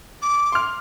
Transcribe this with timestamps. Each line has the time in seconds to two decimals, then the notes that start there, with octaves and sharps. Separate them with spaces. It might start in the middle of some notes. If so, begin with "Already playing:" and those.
0.22 D6
0.52 C6 F6